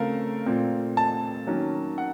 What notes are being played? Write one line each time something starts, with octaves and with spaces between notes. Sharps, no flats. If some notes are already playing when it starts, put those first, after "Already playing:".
Already playing: C#3 A3 C4 F4 A4 A#4 F5
A#2 A3 C4
A5
D#3 F#3 A#3 C#4
F#5